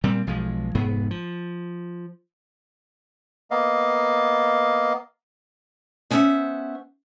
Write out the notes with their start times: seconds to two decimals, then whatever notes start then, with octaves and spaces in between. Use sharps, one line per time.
0.04 A#2 G3 C4
0.27 B1 F3 G#3
0.75 F1 G#2 B3
1.11 F3
3.51 A#3 B3 D#5 F5
6.11 B3 C#4 C5 D#5 E5 F#5